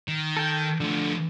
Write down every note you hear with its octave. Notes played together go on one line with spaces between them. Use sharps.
D#3
A4 G5
D3 F3 A3